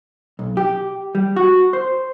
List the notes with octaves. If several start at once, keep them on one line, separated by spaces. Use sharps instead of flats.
B1
G4
G3
F#4
C5